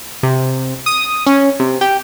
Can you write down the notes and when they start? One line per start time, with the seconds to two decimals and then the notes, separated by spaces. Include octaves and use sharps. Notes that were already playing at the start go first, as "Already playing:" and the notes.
0.23 C3
0.86 D#6
1.26 C#4
1.60 C3
1.81 G4